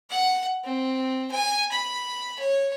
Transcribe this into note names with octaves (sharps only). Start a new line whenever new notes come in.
F#5
C4
G#5
B5
C#5